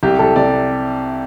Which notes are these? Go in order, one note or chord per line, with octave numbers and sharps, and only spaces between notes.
C2 G4
C2 A4
C3 D5